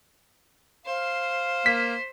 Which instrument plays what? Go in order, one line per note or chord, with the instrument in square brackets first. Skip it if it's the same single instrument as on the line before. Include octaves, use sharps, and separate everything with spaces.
[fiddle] C5 [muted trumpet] F5
[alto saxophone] A#3 [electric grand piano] B6